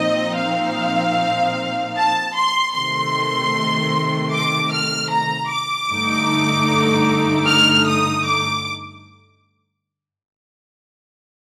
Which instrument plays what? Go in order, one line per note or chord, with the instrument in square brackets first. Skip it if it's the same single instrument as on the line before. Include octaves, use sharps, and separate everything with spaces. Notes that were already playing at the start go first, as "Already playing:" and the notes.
Already playing: [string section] A#2 F3 C4 D#4 D#5
F5
A5
C6
C3 D#3 A3 C6
D6
F6
A#5
D6
G2 D3 A3 D#4
F6
D#6
D6